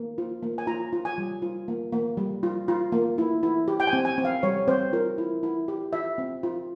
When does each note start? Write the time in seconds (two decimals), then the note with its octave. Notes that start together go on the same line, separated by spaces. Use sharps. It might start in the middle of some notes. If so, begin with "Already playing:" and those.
Already playing: A#3
0.18 F4
0.43 A#3
0.58 G#5
0.67 F4 A#5
0.93 F4
1.05 G#5
1.18 G3
1.42 F4
1.68 A#3
1.92 A#3
2.17 G3
2.43 F4
2.68 F4
2.92 A#3
3.18 E4
3.43 E4
3.68 G4
3.80 G5
3.87 G#5
3.93 C4
4.05 G#5
4.18 C4
4.25 F5
4.43 G3 C#5
4.68 C4 C5
4.93 F4 A#4
5.18 E4
5.43 E4
5.68 G4
5.93 F4 E5
6.18 C4
6.43 F4